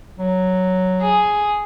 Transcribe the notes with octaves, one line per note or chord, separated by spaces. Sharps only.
F#3
G#4